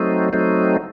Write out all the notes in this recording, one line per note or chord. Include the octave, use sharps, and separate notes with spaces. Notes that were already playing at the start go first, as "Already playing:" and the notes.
Already playing: F#3 A3 C4 D#4
F#3 A3 C4 D#4